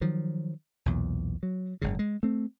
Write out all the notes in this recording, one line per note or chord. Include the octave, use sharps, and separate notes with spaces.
D#3 F3 F#3
B1 E2 A#2
F#3
F#1 G#2 C#3
G#3
A3 C4